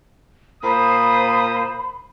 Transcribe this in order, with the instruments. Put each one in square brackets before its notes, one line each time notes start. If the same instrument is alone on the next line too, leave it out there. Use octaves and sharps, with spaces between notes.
[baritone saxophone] A#2 [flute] C5 [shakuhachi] B5 [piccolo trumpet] D#6